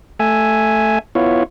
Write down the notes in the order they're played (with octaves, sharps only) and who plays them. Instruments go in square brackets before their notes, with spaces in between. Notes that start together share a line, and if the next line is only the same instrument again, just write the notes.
[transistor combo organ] A3 E5 G#5
B3 E4 F4 C#5